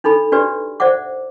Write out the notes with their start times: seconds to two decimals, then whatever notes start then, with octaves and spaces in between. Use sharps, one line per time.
0.04 D4 D#4 A4 B5
0.32 D4 F#4 G4 B4 D5
0.80 C5 D5 E5 F#5 D6